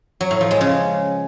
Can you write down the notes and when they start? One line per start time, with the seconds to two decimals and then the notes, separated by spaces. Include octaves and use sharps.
0.21 F#3
0.31 A2
0.41 F3
0.51 G#3
0.61 C#3